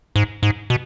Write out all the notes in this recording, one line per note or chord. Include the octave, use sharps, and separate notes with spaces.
G#2
G#2
B2